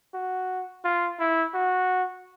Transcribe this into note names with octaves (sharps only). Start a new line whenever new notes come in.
F#4
F4
E4
F#4